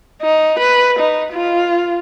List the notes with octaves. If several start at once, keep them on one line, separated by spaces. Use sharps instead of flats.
D#4
B4
D#4
F4